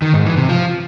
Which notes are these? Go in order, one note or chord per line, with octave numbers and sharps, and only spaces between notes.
D#3
G#2
E3
C3
F3